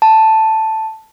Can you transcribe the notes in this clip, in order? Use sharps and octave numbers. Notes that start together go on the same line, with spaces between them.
A5